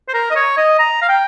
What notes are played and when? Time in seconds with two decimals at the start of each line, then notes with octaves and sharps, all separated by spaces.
0.08 C5
0.14 A#4
0.31 D#5
0.36 C#5
0.57 D#5
0.79 A#5
1.02 F5
1.09 G5